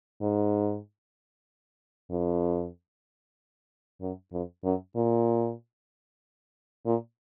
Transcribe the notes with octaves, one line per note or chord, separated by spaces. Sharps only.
G#2
F2
F#2
F2
F#2
A#2
A#2